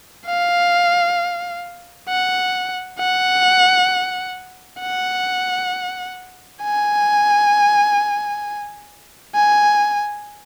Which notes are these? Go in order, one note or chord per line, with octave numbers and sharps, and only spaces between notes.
F5
F#5
F#5
F#5
G#5
G#5